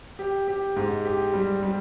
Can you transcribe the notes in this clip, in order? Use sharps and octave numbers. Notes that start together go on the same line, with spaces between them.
G4
G4
G#2
G4
G3
G3